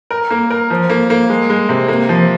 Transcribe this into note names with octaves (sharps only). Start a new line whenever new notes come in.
A#4
A#3
A#4
F3
A#3
A#3
G#3
G#3
C3
A#3
F3